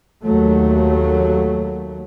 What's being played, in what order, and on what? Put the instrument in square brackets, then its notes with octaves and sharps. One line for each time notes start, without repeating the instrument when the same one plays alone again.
[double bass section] D#2 F#3 A3